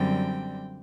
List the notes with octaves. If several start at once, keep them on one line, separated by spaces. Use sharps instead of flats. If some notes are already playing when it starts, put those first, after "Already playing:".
Already playing: F#2 D3 G3 C4 G5